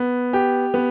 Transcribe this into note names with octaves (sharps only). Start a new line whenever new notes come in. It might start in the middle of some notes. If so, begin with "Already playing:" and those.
Already playing: B3
G4
B3